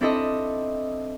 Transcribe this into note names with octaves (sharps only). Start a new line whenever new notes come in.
C4 D4 E4 A4 D#5